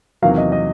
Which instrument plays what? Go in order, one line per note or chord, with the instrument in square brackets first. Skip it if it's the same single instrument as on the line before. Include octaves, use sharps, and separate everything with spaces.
[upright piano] E2 C3 D#3 F#3 A#3 [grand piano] F5
[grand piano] D#5
D#5